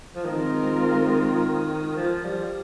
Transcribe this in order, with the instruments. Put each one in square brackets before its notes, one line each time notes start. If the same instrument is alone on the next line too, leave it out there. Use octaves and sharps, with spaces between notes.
[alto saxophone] F3
[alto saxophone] D#3 [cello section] G#3 C4 F4 A#4
[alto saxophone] F3
G3